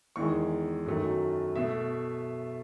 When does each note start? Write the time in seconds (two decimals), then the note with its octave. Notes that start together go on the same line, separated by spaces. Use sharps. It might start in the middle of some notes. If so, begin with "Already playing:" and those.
0.16 E2 D#3 G#3 C#6
0.86 F#2 D#3 F#3 A3
1.56 B2 A3 E5